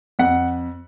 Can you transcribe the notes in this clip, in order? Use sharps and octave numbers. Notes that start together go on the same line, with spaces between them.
F2 F#5